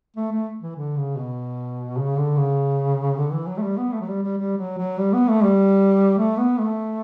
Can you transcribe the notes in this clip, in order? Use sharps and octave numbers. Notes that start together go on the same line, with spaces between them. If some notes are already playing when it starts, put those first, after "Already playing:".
A3
A3
E3
D3
C#3
B2
C#3
D3
C#3
D3
E3
F#3
A3
G3
B3
A3
F#3
G3
G3
G3
F#3
F#3
G3
B3
A3
G3
A3
B3
A3